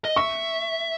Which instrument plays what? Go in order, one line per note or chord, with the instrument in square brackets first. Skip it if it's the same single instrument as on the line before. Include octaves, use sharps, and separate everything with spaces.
[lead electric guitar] D#5
[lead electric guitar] E5 [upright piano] C#6